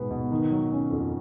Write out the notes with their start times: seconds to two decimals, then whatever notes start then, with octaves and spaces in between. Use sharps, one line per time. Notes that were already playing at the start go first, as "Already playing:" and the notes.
Already playing: G#2 B2 G#3 B3
0.10 B2
0.31 D#3
0.50 F#3
0.71 C#4
0.90 F2